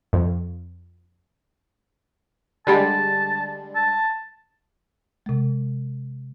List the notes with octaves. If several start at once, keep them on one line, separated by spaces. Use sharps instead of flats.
F2
D3 G3 G#3 A5
A5
C3 G#3